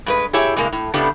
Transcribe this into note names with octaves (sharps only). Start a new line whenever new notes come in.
G2 G#3 B4
E4 G4 G#4 C#5 E5
G2 C3 G#3 A#3
A2
A2 C#3 A3 B3 D4 G4